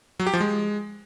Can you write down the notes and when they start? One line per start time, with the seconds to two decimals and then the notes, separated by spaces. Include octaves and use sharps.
0.20 F#3
0.27 G4
0.33 F3
0.40 G#3